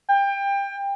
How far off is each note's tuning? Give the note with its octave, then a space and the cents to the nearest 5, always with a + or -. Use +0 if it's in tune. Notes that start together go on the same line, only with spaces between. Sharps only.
G5 +25